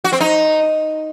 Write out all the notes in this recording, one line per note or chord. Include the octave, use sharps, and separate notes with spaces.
F#4
C4
D#4